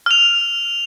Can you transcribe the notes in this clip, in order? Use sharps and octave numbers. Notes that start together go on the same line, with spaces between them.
F6 F7